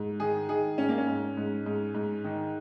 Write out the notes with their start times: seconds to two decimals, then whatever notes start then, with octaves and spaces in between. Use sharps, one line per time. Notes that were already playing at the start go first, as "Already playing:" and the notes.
Already playing: G#2
0.20 D#3 G#4
0.49 D#3 G#4
0.78 G#2 C#4
0.89 A#3
0.98 C#4
1.07 G#2
1.37 G#2
1.66 G#2
1.94 G#2
2.24 D#3